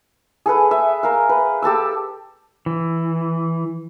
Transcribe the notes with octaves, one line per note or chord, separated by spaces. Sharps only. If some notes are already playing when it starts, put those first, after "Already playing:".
G#4 A4 B4
E5
A#4 F5
B4
G4 A4 A5 E6
E3